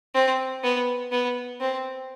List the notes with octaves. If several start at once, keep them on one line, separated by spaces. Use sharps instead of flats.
C4
B3
B3
C4